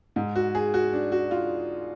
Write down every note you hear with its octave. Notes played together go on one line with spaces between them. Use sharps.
G#2
F#4
G#4
F#4
D4
F#4
F4